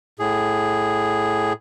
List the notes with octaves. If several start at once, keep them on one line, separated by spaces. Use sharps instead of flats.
A2 G#4